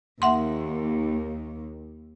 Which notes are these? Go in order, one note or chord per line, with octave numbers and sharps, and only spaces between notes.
D#2 E5 F#5 C6